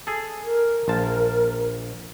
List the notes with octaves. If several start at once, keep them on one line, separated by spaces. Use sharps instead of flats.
G#4 A4
A#4
A#1 F4 A5